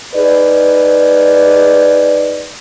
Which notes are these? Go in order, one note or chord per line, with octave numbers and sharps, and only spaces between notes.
D#4 G#4 B4 D5